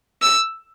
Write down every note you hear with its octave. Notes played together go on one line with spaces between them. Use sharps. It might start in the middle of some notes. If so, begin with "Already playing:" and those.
E6